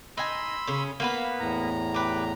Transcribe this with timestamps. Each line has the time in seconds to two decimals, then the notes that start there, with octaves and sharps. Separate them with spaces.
0.17 D#4 G#5 B5 C6 E6
0.67 C#3 C#4
1.00 A#3 B3 B4 F5
1.40 E2 A2 A#5
1.94 G4 B4